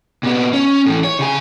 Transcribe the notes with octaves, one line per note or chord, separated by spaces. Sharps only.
A#2 B3
C#4
A2 E3
C#5
C#3 G#5